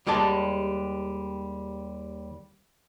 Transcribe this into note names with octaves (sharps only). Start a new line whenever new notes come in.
D#2 G3 G#3 D5 A5